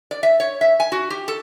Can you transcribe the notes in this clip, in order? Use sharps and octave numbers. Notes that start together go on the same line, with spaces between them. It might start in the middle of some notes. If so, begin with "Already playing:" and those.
D5
E5
C#5
E5
G#5
F#4
G4
A4